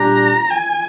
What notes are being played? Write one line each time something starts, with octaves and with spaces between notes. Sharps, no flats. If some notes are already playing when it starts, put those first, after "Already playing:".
Already playing: A#2 G3 D4 G4 A#5
G#5